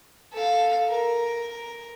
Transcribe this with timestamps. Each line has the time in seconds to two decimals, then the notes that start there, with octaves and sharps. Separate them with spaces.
0.33 A4 F5
0.89 A#4